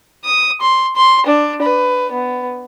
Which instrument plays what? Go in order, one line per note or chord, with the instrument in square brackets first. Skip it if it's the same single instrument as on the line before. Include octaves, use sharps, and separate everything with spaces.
[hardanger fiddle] D#6
C6
C6
D4
B4
B3